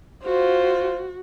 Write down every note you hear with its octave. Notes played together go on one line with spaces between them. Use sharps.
F4 F#4 C5